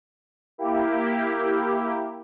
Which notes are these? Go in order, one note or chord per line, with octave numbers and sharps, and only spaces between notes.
A#3 E4 G4